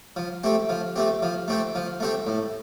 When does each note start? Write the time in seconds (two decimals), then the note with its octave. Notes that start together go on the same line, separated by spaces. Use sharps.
0.16 F3
0.44 A3 C4 G4
0.69 F3
0.96 A3 C4 G4
1.22 F3
1.48 A3 C4 G4
1.75 F3
2.00 A3 C4 G4
2.27 A2